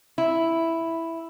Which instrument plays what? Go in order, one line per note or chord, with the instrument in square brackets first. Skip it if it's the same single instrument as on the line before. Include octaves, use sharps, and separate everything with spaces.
[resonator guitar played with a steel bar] E4